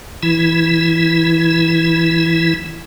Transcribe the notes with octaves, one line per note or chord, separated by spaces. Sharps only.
E3 E4